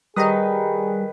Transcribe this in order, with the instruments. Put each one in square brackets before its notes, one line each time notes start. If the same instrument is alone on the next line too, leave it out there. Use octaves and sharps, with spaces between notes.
[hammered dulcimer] D#3 B4 [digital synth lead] G3 [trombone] G#4 [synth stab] D#5 A#5 D#6